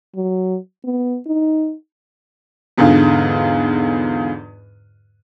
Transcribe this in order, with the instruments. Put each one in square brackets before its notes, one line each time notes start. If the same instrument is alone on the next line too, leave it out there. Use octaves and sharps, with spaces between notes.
[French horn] F#3
B3
D#4
[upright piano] E2 G#2 D3 F4